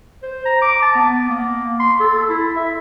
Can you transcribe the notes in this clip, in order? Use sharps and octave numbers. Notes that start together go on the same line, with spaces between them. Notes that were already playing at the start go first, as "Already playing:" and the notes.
C5
A#5
D6
A5
B3
A#3
C6
A4
E4
E5